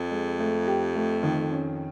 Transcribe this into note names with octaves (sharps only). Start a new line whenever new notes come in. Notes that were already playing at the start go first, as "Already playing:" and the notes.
Already playing: F2
G#3
A3
G4
A3
D#3
C#4